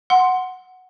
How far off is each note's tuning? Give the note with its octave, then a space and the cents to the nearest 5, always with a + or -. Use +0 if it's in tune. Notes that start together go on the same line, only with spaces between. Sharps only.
F#5 +0 C6 +0